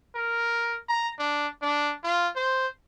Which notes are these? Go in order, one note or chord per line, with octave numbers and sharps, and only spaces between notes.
A#4
A#5
D4
D4
F4
C5